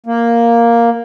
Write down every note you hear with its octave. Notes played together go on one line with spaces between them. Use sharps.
A#3